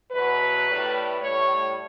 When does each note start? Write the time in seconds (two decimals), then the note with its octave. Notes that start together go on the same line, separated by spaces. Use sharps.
0.12 E2 B2 F#3 B4
0.67 A2 G3
1.21 A2 G3 C#5